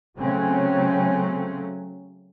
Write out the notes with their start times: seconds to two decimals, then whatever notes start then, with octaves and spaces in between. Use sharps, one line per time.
0.18 C#3 F#3 A3 C4 C#4